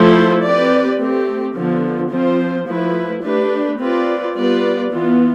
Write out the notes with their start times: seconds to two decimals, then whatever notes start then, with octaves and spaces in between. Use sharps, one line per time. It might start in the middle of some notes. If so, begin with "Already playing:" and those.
Already playing: F3 A3 E4 A4 C5
0.42 C4 G4 B4 D5
0.98 A3 C4 G4
1.54 D3 F3 B3
2.11 F3 C4 F4 C5
2.67 F3 A3 E4 B4
3.23 A3 D4 G4 B4
3.78 C4 F4 B4 D5
4.35 G3 B3 F4 B4 D5
4.91 E3 B3 F4